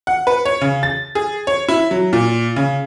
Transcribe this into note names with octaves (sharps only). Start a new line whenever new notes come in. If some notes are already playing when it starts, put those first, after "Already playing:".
F#5
B4
C#5
C#3
A6
G#4
C#5
E4
F#3
A#2
C#3